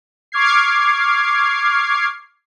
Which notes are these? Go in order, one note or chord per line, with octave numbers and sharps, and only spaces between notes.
C#6 D6 F6 G#6 C7